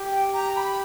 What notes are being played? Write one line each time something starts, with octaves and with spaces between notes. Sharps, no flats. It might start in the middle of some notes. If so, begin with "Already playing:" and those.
Already playing: G4
G5
A#5
B5
B5